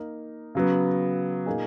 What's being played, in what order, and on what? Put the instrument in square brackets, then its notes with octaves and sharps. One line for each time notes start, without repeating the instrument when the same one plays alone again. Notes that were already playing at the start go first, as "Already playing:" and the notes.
Already playing: [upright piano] A#3 D#4 A#4
C#3 F#3 B3
A#2 A#3 D#4 G#4